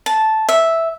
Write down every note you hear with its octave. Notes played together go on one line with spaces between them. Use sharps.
A5
E5